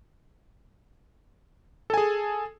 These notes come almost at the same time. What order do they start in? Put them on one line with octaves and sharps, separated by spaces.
A4 G#5 G#4